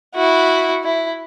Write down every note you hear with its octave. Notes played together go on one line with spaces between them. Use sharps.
E4 F#4
E4